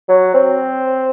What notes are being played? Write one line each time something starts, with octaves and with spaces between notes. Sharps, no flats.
F#3
C4